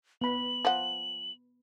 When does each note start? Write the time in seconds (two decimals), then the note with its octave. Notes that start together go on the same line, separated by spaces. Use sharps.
0.21 B3 B5 F#7
0.65 F3 F#5